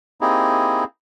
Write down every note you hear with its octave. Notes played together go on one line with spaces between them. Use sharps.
A#3 C4 D#4 E4 G4 G#4